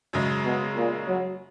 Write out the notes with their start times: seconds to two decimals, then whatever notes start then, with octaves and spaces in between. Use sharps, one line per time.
0.13 F#2 C#3 G#3
0.45 B2
0.76 A#2
1.08 F#3